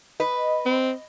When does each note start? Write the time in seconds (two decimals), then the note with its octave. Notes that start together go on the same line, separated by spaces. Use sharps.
0.20 B4 D#5
0.66 C4